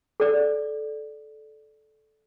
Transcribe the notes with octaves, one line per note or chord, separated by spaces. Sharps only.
A4 D5